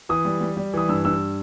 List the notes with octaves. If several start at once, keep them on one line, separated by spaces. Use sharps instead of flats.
E3 D#6
G3
G3
G3
E3 D#6
G2 E6
G2 E6